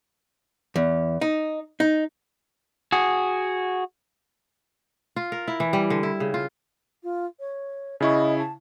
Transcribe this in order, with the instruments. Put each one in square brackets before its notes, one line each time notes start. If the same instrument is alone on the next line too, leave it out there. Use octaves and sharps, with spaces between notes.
[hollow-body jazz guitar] E2
D#4
D#4
[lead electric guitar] F#4 G#4
[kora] F4
A#4
E4
E3
G3
D3
E4
C#3
F4
[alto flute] F4
C#5
[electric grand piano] C#3 E4 C#6 [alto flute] D#5
[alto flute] A5